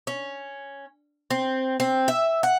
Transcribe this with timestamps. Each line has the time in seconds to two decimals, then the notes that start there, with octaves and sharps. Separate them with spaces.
0.07 C#4
1.30 C4
1.80 C4
2.08 E5
2.43 F#5